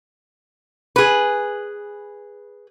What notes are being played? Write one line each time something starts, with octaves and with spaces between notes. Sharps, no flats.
G#4 B4